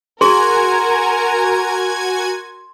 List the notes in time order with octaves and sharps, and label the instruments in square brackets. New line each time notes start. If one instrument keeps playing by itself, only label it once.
[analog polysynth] F#4 G#5 G#6 [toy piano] G#4 [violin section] A#4 [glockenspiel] C6